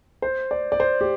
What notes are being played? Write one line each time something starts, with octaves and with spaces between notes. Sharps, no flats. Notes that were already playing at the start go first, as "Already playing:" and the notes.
C5
D5
D5
C5
G4